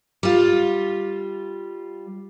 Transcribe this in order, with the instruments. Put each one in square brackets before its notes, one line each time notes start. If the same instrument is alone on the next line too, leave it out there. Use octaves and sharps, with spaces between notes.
[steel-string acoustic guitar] G3 F4